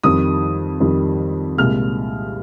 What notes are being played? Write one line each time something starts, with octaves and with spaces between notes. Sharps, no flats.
F2 D#3 G3 D#6
F2 D#3 G3
C2 A#2 G#3 F6